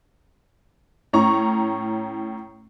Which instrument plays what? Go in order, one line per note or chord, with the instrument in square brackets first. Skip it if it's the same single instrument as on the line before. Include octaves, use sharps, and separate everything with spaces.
[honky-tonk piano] A2 C#4 A#5 C#6